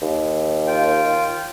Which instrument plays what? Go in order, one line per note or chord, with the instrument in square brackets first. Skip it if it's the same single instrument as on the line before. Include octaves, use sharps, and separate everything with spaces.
[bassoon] D#2
[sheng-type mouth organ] F4 G5